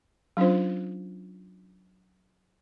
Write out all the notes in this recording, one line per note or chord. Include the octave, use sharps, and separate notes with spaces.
F#3 C#4 D4 F4 C5